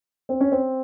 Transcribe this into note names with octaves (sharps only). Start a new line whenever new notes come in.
C4
C#4
C4